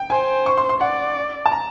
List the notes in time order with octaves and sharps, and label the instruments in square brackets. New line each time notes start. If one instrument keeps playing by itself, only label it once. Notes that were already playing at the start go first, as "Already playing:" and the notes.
Already playing: [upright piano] G5
[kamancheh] C5 [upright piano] G#5
[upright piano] C#6
C6
C6
[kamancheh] D5 [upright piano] F#5
[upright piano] A5
A#5